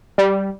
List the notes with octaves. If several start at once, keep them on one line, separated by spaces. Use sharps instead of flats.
G3